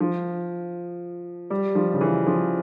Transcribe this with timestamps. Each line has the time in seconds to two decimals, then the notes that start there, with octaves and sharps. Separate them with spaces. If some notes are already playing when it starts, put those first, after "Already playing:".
0.01 F3
1.50 G3
1.75 F3
1.94 C#3
2.01 E3
2.27 F3